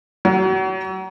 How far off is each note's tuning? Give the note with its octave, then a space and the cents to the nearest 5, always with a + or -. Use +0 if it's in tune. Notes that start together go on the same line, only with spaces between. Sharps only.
F#3 +30